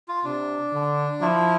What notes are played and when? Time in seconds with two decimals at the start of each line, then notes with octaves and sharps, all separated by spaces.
0.08 F4
0.24 C3 D4
0.73 D3
1.21 F3 E4